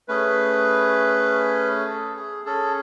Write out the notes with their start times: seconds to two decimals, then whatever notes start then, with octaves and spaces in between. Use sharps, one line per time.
0.08 A3 C#4 G#4 B4
1.86 A4
2.16 G#4
2.45 C#4 G#4 A4